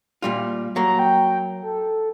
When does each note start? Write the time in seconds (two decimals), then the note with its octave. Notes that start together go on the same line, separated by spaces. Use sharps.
0.22 A#2 G3 F4
0.76 F#3 A#3 A#5
0.99 G5
1.62 A4